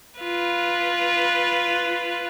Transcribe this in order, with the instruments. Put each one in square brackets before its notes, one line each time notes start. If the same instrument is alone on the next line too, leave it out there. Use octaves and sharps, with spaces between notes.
[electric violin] F4 B4